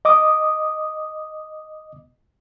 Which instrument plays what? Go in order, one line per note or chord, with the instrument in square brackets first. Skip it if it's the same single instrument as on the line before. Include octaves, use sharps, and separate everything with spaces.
[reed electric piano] D#5 D6 D#6